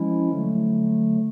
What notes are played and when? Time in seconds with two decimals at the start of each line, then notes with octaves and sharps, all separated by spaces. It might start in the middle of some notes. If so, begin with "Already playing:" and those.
Already playing: F3 G#3 C#4 E4
0.30 D3 F#3 A3